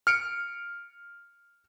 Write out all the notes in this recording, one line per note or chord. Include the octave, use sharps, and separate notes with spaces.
F6 C#7 D7